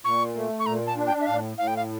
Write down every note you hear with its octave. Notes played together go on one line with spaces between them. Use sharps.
A#2 C#6
A3
C#6
A#2 A#5
A5
D4
G5
E5
A2 F5
A2 F5
G5
F5